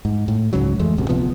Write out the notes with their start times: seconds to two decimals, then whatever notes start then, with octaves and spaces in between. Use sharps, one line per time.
0.05 G#2
0.28 A2
0.53 C#2 G#2 C#3 F#3
0.79 F2 E3 G#3 A3
0.98 D1 C2 F#2 C3
1.09 D1 C3 F3 B3